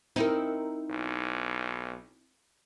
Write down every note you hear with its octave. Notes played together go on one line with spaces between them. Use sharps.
C4 D#4 E4 A#4 C#6
B1